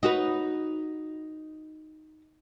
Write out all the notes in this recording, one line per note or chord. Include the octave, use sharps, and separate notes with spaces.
D#4 F#4 B4